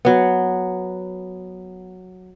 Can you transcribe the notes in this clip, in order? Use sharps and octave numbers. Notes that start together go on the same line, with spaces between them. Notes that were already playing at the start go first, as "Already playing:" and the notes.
F#3 B3